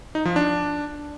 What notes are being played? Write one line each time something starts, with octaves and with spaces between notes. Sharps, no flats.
D#4
F3
D4